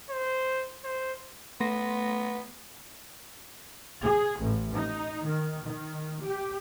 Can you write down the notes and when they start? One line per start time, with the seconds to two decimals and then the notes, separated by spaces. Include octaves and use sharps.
0.10 C5
0.84 C5
1.60 A3 B3 C6 A#6
4.03 G#4
4.40 A1
4.75 D#4
5.26 D#3
5.65 D#3
6.23 G4